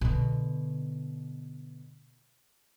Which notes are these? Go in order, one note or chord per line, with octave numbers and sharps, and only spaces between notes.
B2 D3